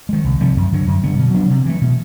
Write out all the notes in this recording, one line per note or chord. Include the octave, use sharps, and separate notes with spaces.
D#3 G#3
C2
C3 F3 A3
F#2
D3 F#3
F#2
D3 G3 B3
B2
F#3 B3 D4
C3
E3 A3
B2